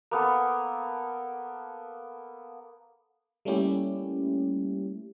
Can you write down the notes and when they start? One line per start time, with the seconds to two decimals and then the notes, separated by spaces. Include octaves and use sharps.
0.11 A#3 B3 A4
3.45 G3 A3 A#3 C#4 E4 G4